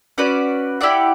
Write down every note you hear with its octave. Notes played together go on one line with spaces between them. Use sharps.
C#4 F#4 B4 D5
E4 G4 D5 F#5